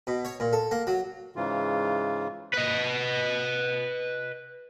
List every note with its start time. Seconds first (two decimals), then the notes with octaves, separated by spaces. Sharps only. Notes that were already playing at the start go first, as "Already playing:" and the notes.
0.07 B2
0.25 C#5
0.40 A#2
0.53 A4
0.71 A#3
0.87 F#3
1.36 G#2 C#3 E3 F4
2.54 B4 D#5